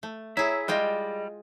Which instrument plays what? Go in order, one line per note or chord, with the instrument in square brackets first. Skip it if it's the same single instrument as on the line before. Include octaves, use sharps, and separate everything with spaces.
[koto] A3
[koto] E4 G#4 [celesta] C#5 A#5 [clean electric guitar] E5
[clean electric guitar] G3 [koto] G#3 F4 G5 [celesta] G#4 D#5 A#6